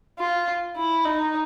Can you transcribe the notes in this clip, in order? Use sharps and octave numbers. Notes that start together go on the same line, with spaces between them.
F4
E4
D#4